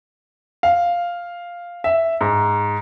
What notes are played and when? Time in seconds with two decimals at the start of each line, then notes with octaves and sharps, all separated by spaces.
0.63 F5
1.84 E5
2.21 G#2